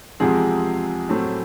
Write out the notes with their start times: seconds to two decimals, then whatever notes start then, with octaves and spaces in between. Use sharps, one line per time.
0.20 E2 C3 F3 G#3 C4 G#4
1.09 A2 F#3 A3 C4